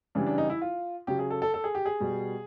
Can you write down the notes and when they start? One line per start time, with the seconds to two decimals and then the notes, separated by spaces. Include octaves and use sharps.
0.15 C#3 E3 G3 D4
0.27 D4
0.38 D#4
0.50 E4
0.62 F4
1.07 C#3 F#3 G4
1.19 G#4
1.30 A4
1.42 A4
1.54 A4
1.64 G#4
1.75 G4
1.86 G#4
2.00 B2 G3